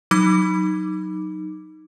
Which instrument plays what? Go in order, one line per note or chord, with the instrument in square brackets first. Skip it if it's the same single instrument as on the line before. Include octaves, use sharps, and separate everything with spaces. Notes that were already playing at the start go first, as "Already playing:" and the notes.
[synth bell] F#3 D#4 D6